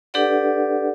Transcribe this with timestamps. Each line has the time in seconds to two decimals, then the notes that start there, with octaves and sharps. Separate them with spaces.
0.14 D4 G4 A4 B4 D5 F#5